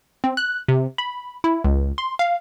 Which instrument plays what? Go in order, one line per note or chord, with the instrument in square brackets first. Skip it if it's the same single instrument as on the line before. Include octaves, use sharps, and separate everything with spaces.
[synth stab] C4
F#6
C3
B5
E4
C#2
C6
F5